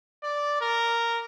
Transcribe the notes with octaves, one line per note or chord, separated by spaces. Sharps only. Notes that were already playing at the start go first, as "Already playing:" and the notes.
D5
A#4